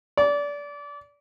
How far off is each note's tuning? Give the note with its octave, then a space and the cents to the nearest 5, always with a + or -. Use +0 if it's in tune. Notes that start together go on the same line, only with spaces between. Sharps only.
D5 -25